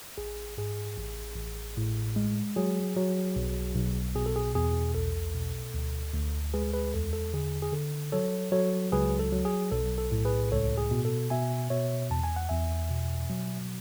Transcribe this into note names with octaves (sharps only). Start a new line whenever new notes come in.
A1 G#4
G#2 G#4
A1
A1
A2
G#3
F#3 G#4
F#3
B1
B1
B2 G#4
A4
G#4
E2 G#4
B1 A4
B2
D2
D2
G#3 G#4 B4
G#4 B4
E2 A4
A4
D3 G#4
G#4
D3 A4
F#3 A4 C#5
F#3 A4 C#5
C#2 G#4 B4
A4
F#3
G#4
B1 A4
A4
A2
G#4 B4
C#2 A4 C#5
G#4
B2
A4
B2 E5 G#5
B2 C#5 E5
E2 A5
G#5
F#5
E2 E5 G#5
B2
F#3